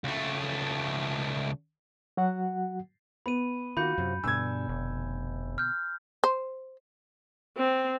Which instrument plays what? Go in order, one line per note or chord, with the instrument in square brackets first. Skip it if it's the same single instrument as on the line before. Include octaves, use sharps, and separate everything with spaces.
[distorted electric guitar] C#2 A3
[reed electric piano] F#3 F#4 F#5
[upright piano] B3 [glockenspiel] B5 D#7
[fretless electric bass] D#3 [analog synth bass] A#3 [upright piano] F4 F#4 [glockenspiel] B5 G6 C#7
[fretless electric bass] F#2 F#3 [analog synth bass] C3
[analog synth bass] G2 [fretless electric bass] B2 D3 [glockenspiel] G#5 [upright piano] E6 G#6
[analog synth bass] F1
[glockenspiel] F6 G6
[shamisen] C5
[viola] C4